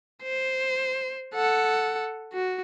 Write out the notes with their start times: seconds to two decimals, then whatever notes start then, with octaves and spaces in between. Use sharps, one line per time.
0.23 C5
1.35 A4 F#5
2.33 F#4